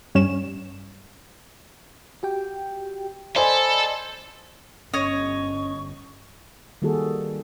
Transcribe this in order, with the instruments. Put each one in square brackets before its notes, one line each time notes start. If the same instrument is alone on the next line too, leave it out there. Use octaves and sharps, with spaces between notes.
[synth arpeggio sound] G2 C#4 E7
[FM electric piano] F#4 G4 G5
[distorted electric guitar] A4 [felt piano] C5 G#5 [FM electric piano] D5 D#5 B5
[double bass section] G1 [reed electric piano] C#4 [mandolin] C#5 D#5 [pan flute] C#6
[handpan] D#3 G3 A#3 F#4 G#4 A4